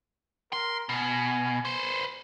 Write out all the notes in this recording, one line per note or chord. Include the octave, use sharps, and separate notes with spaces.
A#4 C6
B2 G#5
B4 C5